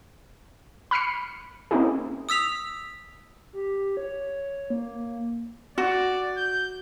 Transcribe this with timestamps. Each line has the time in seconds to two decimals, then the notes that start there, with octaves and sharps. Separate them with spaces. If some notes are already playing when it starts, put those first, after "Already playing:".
0.91 B5 F6 C7 C#7
1.71 A#3 C4 C#4 D#4 E4 G#4
2.29 D#6 E6 B6 F7
3.53 G4
3.97 C#5
4.70 A#3
5.78 F#4 D5
6.37 G6